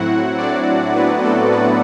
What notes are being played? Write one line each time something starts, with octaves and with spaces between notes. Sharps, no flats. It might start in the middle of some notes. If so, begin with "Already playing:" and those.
Already playing: A2 F#3 C4 E4 F#4 F#5
D4 D5
B3 B4
A3 A4
B3 B4